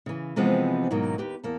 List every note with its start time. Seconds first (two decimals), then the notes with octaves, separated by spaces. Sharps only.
0.06 C#3 E3
0.36 C3 E3 F3 G#3 B3 C4
0.91 G#2 B2 D#3 F#3 A#3
1.18 D#2 G4 B4
1.43 E2 A#3 A5